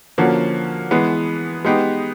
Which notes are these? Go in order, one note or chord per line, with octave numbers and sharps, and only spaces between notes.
D3 F3 A#3 C#4 F#4
E3 G#3 B3
G#3 B3 D#4 G4